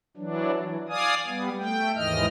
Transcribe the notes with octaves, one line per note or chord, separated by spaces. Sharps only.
E3 F#3 D4
E3
D5 F5 G#5 D#6
G3 B3
A3 G5
D#2 G#2 E3 D#5 F6